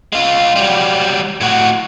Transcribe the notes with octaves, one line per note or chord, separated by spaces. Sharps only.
G#3 F4
F#3 G3
A2 F#4